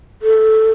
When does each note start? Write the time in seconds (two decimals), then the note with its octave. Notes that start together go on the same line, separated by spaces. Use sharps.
0.22 A4